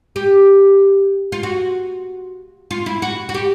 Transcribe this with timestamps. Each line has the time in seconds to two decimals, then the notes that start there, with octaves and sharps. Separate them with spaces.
0.16 G4
1.32 F4
1.43 F#4
2.71 F4
2.86 E4
3.02 F#4
3.29 F#4
3.34 G4